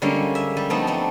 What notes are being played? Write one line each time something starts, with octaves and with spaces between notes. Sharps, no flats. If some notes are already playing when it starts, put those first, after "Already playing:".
D3 G3 G#3 A#3 C#4
E5
G3
F3 A3 B3 C4 D#4
A3 D4 D#4